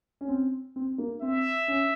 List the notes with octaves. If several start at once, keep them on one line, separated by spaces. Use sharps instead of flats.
C#4
C4
C4
A#3
C4 E5
C#4